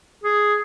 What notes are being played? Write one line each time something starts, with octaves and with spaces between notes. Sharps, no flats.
G#4